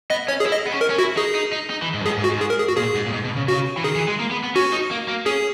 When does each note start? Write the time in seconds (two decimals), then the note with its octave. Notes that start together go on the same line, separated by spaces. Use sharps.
0.10 B3 D#5
0.28 C#4 C#5
0.40 G#4
0.46 E4
0.52 D#5
0.67 B3
0.72 C#4
0.81 A#4
0.90 C#4
0.98 E4 F#4
1.17 D#4 G#4
1.35 D#4
1.52 D#4
1.70 D#4
1.82 E3
1.94 G#2
2.01 F#2
2.06 G#2 G#4
2.18 G#2
2.24 F#4
2.29 G#2
2.41 G#4
2.50 A#4
2.59 G#4
2.68 F#4
2.77 A#2 G#4
2.95 G#2
3.06 A#2
3.13 G#2
3.25 B2
3.36 C#3
3.48 C#3 F#4
3.77 E3
3.84 D#3 G#4
3.96 E3
4.08 G#3
4.20 A#3
4.31 B3
4.44 B3
4.55 C#4 F#4
4.73 D#4
4.91 A#3
5.08 A#3
5.26 C#4 G#4